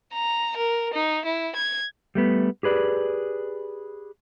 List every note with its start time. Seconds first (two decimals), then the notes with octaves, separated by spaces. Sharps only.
0.14 A#5
0.57 A#4
0.94 D#4
1.25 E4
1.56 G#6
2.15 G3 A3 B3
2.63 G4 G#4 B4 D5